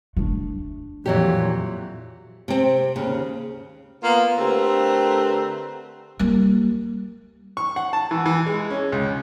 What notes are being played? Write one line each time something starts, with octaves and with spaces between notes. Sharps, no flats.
A3 D4
F2 A#2 E3 F#3 G4
C3 C4
D#2 C#3
A#3 B3 F4
D3 A3 C4 G4 A#4 B4
G3 A#3
C#6
F#5
A5
E3
E3
G#3
C#4
C#2